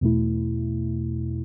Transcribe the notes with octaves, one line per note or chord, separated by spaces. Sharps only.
E2 B2 A3 E4